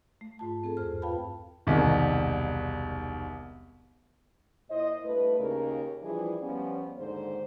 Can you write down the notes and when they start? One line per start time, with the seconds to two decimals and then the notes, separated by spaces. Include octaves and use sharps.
0.21 A3
0.39 G#2 F4 A5
0.64 C4 G#4 A4
0.77 E2 G2 G#4 C5 F6
1.02 F4 B4 F5 G5 A5 B5
1.67 E1 C2 D#3
4.69 A#2 E4 C5 D#5
5.04 G2 A3 E4 B4
5.39 D#2 C#3 A#4
6.01 E3 F3 G3 D4 E4 G#4
6.41 F3 G3 B3 C#4
6.97 D#2 G#2 D3 C5